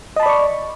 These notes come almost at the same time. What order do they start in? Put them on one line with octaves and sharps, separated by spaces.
D#5 A5 B5 D5 C#6